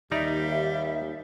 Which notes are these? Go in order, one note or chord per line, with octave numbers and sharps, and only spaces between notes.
D#2 G3 D#4 D5 E5 A#5